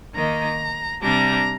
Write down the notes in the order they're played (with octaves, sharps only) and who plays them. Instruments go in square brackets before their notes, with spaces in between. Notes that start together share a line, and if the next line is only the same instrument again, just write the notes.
[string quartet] D#3 A#3 D#4 A#5
C3 G3 D4 A#5